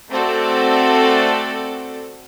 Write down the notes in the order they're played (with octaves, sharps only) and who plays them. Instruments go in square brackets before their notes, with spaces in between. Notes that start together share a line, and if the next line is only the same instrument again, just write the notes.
[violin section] A3 C4 F#4 A4 D5 A5